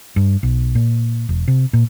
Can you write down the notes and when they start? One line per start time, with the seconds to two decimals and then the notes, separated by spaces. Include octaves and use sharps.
0.16 G2
0.43 B1
0.75 A#2
1.29 E1
1.48 C3
1.73 A#2